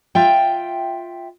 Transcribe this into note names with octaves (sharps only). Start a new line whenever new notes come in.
F4 E5 G5